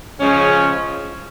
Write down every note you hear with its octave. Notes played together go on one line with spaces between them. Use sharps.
C#3 F3 G#3 C#4